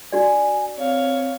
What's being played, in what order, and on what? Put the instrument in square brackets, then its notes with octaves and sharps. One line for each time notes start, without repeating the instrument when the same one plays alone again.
[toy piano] D4 F#4 D5 [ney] G#5
[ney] C4 [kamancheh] C#5 F5